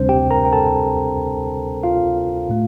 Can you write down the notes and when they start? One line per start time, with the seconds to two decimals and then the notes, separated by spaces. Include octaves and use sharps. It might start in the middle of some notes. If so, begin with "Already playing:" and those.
Already playing: D2 C3 G3 C4 D4 C5
0.09 G4 G5
0.30 A#4 A#5
0.45 G5
0.53 A4 A5
1.83 F4 F5
2.49 A2 A3